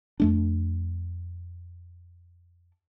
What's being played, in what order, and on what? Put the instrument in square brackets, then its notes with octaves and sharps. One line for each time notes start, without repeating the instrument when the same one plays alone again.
[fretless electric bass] F2 A3 D4